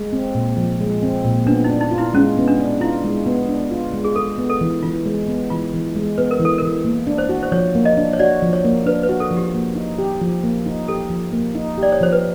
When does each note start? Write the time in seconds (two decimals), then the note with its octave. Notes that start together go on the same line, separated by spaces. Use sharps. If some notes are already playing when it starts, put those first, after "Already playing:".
Already playing: G#3
0.13 C4
0.35 A#2
0.57 F3
0.80 G#3
1.03 C4
1.24 A#2
1.46 B3 D4
1.64 D#4
1.70 D4
1.81 D#4
1.91 F4
1.98 E4
2.14 G#3 C#4
2.37 B3
2.48 D4
2.60 D4
2.81 E4 F4
3.04 G#3
3.26 B3
3.49 D4
3.71 F4
3.94 G#3
4.04 G#4
4.16 G#3 A4
4.38 B3
4.50 A4
4.61 E3
4.83 E3 F4
5.06 G#3
5.29 B3
5.50 E3 F4
5.73 E3
5.96 G#3
6.18 B3 B4
6.31 A#4
6.40 E3
6.45 A4
6.58 A#4
6.62 E3
6.85 A#3
7.07 D4
7.18 C5
7.29 F#4
7.43 C5
7.52 F3 C#5
7.75 A#3
7.85 D#5
7.97 D4
8.13 C#5
8.19 F#4 D5
8.42 F3
8.53 C#5
8.65 A#3
8.86 D4 B4
9.03 B4
9.09 F#4
9.20 A4
9.31 F3
9.37 G4
9.54 A#3
9.76 D#4
9.98 G4
10.21 F3
10.44 A#3
10.66 D#4
10.88 G4 A4
11.10 F3
11.33 A#3
11.55 D#4
11.78 G4 D5
11.92 C#5
12.01 F3 C5
12.12 B4